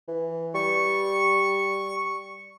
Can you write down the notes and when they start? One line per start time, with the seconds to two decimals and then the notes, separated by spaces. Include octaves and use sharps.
0.08 E3
0.55 G3 C#6